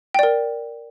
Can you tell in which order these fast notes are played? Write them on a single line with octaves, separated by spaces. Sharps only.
G5 D5 A#4